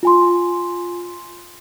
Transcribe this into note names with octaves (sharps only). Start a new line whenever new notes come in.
F4 G#5 C6